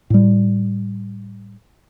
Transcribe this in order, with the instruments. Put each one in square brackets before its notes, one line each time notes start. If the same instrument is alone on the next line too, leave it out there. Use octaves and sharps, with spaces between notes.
[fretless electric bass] A2 G3